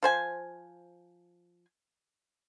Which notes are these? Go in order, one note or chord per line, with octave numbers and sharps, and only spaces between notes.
F3 C5 G#5